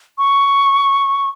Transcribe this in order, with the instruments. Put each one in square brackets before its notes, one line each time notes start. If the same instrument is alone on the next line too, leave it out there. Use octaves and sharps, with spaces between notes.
[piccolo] C#6